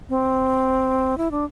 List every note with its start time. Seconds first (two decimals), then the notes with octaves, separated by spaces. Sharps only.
0.09 C4
1.18 E4
1.31 D4